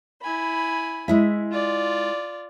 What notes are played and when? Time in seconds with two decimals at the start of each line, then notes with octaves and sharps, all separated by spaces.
0.22 E4 G#5 B5
1.08 G#3 E4 E5
1.51 F4 D5